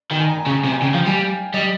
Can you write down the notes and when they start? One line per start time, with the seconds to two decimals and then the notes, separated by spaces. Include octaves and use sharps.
0.10 D#3 G5
0.19 G#5
0.28 A#5
0.38 G#5
0.46 C#3
0.64 C3
0.72 G#5
0.82 C#3 G5
0.94 F3 F5
1.06 G3 G#5
1.54 G3 D#5